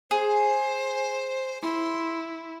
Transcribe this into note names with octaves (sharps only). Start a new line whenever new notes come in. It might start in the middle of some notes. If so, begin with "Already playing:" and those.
G#4 C5
E4 C6